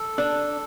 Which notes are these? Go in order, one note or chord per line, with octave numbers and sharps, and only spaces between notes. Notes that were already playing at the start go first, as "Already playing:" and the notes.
Already playing: A4
D4